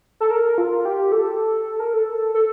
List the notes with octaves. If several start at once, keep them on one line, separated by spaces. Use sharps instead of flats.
A4
A#4
F4
G4
A4
A#4
A4
A4